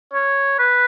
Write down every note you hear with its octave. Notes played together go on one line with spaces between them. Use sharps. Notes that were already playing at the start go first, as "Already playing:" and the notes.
C#5
B4